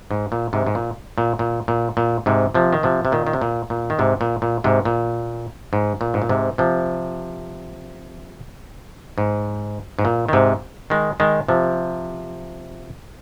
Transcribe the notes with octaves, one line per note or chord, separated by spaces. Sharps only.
G#2
A#2
G#2 C3
G#2
A#2
A#2
A#2
A#2
A#2
G#2 C3
C3 F3
D#3
C3 F3
C3
A#2 D#3
D#3
C3
A#2
A#2
D#3
G#2 C3
A#2
A#2
G#2 C3
A#2
G#2
A#2
G#2
A#2
G#2 C3
C3 F3
G#2
G#2
A#2
D#3
G#2 C3
D#3 G#3
D#3 G#3
C3 F3